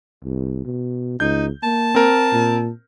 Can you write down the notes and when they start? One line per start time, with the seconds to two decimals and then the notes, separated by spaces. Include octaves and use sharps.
0.24 C2
0.65 B2
1.20 C#2 D#4 G6
1.63 A#3 A5
1.95 C4 A#4
2.33 A#2